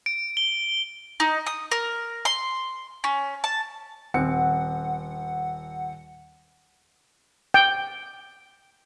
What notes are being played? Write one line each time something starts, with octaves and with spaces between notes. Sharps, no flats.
D7
G7
D#4
D#6
A#4
C6
C#4
A5
D#1 C4 F#5 C#7
G5